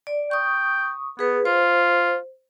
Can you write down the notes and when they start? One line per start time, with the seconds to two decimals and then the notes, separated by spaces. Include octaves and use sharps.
0.07 D5
0.31 G5 C#6 D#6
1.19 B3 G#4 B4
1.45 F4 C5